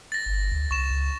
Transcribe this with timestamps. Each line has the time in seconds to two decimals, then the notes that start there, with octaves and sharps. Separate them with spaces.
0.12 A6 A#6
0.26 G1
0.51 D2
0.71 C2 C#6 E7
0.91 C#2